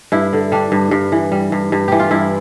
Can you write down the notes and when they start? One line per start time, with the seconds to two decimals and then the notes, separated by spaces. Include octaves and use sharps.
0.12 G2 E4
0.33 D3
0.52 G3 D4
0.72 G2
0.91 G2
1.12 E3
1.32 G3
1.52 G2
1.72 G2
1.88 E3 G4
2.00 F4
2.11 G2 E4